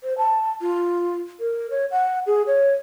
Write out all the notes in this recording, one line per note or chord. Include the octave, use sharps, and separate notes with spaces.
C5
A5
F4
A#4
C#5
F#5
G#4
C#5